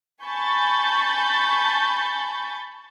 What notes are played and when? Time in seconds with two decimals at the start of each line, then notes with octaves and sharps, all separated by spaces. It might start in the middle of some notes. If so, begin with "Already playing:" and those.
0.23 G#5 A5 B5 C#6 G6 A6